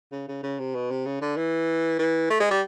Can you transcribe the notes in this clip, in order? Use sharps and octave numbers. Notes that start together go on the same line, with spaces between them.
C#3
C#3
C#3
C3
B2
C3
C#3
D3
E3
E3
A3
G#3
G3